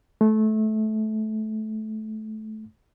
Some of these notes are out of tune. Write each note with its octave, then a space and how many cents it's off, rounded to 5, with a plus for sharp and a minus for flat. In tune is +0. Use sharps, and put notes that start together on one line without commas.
A3 -20